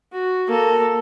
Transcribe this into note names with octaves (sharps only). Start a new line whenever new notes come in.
F#4
A#3 A4